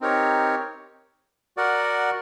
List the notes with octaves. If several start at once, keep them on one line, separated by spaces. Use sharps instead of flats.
C4 D#4 G4 A#4 C#5
F#4 A#4 D5 F#5